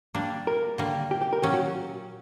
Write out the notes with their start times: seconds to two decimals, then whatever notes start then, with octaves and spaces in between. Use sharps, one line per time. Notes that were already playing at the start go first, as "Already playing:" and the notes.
0.15 G3 A#3 D4
0.47 A#4
0.78 D3 G3 A#3
1.11 G4
1.21 G4
1.33 A#4
1.42 A#2 F#3 C#4 G4
1.54 F#4